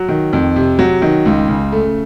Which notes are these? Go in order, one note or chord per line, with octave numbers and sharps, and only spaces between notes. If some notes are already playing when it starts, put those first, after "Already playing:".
Already playing: F#3
D#3
F2
C3
F#3
D#3
C#2
C#3
A3